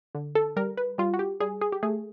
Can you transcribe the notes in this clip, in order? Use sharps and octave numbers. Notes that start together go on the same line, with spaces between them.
D3
A4
G3 A#4
B4
G3 F4
F#4
G4
G3 G#4
G#4
G4
A3 G#4